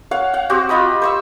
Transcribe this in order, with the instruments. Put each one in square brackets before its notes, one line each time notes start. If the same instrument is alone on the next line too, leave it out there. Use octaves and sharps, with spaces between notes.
[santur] C#5 F5 F#5
F5 F#5
C4 F#4 G4
F4 D#5 B5 D#6
C5 C#6 E6